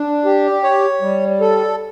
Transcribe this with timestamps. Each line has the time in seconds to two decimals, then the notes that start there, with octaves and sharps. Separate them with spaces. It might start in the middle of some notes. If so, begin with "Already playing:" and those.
Already playing: D4
0.25 G4
0.63 C#5
1.01 G3
1.41 A4